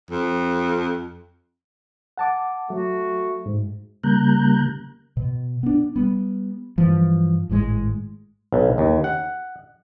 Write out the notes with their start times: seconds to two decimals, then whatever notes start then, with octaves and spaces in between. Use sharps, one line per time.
0.11 F2
2.18 F#5 A5 D6
2.70 F#3 A3 F#4
3.46 G#2
4.04 C#3 G3 A#3 A#5 F#6 G6
5.17 B2
5.63 B3 D4
5.96 G3 B3
6.78 G2 E3 F3
7.49 G#1 A2 D#3 G#3
8.53 B1
8.78 D#2
9.04 F#5